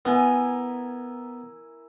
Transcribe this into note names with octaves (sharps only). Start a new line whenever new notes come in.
B3 E4 A#4 G#5